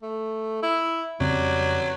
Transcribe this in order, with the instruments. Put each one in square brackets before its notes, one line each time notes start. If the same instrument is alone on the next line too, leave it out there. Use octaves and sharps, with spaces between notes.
[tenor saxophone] A3
E4
[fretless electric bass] F2 C#3 C4 [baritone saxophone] F#3 [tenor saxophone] G3